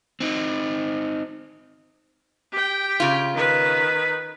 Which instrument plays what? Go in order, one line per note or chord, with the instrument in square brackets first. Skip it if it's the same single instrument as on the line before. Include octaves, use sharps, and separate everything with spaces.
[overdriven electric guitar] C4 D#4
[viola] G4 G5
[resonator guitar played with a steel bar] C#3 F4
[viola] D#3 B4